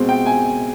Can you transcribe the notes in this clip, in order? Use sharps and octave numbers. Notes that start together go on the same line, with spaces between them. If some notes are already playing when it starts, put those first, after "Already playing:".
Already playing: B2 G#3 C4
G5
G#5